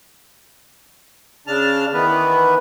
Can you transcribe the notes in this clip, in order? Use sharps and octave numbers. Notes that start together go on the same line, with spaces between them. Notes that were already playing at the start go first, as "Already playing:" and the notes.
C#3 D4 A5 F6
D#3 E3 B3 B4